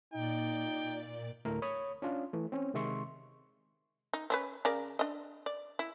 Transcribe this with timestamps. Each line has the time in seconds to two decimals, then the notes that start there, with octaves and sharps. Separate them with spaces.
0.14 A#2 D#4 D5 G5
1.45 D2 A2 A3 A#4
1.62 C#5 B5 D#6
2.02 C#4 D4 F4
2.33 E3 A3
2.52 C4 C#4
2.74 C3 D#3 G#3 E5 C6 C#6
4.13 D#4
4.30 C4 C#4 B4
4.65 C#3 A#4 D5
4.99 D4 D#5
5.46 D5
5.79 E4